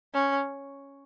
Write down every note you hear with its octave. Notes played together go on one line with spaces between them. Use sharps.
C#4